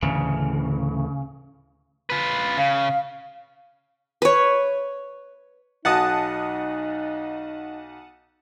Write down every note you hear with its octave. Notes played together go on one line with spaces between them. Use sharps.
D2 A2 C#3 E3
F4 B4
C#3 F5
B4 C#5
B1 D#4 F#4 D#5 F#5 A5 D#6